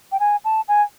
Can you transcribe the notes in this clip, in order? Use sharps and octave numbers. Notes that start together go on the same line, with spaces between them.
G5
G#5
A5
G#5